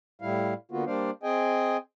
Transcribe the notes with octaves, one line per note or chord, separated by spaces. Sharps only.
A2 G3 E4 F5
D3 A#3 B3 F4 F#4
G3 A#3 D4 C5 D5 F5
C4 G#4 D#5 G5 G#5